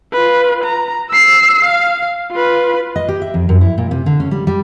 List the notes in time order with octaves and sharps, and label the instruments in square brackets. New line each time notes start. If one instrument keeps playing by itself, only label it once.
[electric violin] F4 B4
A#5
E6 C7
F5
F4 B4
[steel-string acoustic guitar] D#5
G4
E5
F2
F#2
E4
A#2
C3
D3
C#4
G3
G3